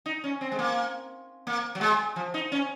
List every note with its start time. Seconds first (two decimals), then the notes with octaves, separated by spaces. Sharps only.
0.06 D#4
0.24 C#4
0.41 C4
0.52 G#3
0.59 A#3
1.47 A#3
1.75 F#3
1.81 G#3
2.16 F3
2.34 D#4
2.52 C#4